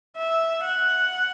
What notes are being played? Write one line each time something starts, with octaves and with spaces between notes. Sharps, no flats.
E5
F#5